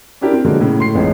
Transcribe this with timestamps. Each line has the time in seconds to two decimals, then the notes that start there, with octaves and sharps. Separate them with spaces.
0.21 C#4 D4 E4 G4 A#4
0.33 C4
0.45 D3 F3 F#3 G#3 A#3
0.61 A2 C#3
0.79 A2 C6 C7
0.95 A1 F2 G#2 G#3